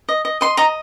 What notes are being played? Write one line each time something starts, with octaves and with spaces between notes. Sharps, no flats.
D#5
D#5
D#5 C6
D#5 A#5